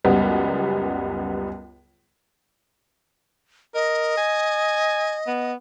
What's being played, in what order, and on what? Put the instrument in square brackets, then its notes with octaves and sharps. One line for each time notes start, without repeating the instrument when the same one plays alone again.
[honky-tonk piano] C#2 F#2 G3 B3
[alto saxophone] A#4 [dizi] D#5
[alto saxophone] G#5
B3